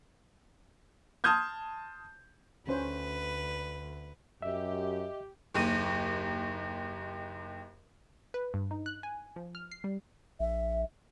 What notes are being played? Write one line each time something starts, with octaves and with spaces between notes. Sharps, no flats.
A5 C6 D#6 F6 G6 G#6
D2 D3 C#4 B4 C5
F#2 G4 D#5 E5
F#1 D#2 D#7
B4
G2
D#4
F#6
G#5
F3
F6
C7
G3
A#1 E5